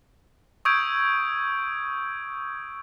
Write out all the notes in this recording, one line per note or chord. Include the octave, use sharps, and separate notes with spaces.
C#6 D#6 E6 G6 G#6 D7